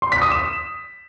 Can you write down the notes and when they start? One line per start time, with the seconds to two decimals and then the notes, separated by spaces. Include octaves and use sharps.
0.02 C6
0.12 B6
0.22 D#6
0.31 E7